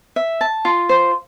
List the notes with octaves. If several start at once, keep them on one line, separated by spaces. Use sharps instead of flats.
E5
A5
F4
C5